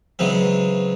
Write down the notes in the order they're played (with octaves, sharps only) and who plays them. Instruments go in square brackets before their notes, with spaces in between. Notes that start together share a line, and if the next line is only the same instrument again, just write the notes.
[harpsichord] C#3 E3 F#3 G#3 C4